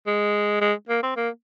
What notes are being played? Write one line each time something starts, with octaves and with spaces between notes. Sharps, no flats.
G#3
G#3
A#3
C4
A#3